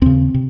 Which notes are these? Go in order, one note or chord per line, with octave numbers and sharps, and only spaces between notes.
D#2 C#3 C4
C3